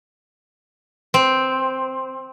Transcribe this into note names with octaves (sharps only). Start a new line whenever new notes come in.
C4